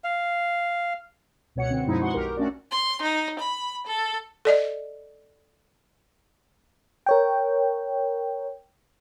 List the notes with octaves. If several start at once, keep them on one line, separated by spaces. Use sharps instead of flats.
F5
C#2 B2 C#5 F#5 C#7
D3 C4
F#2 B2 F3 G#3 D#4 E4
G#3 F#4 F#5 C6 C#6
B1 G4 A#4
A3 C#4 D4 F#4 D5
C6
D#4
B5
A4
A4 D5 D#5
A#4 C#5 G5